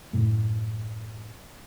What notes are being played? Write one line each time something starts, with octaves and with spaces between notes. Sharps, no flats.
F#2 A2 A3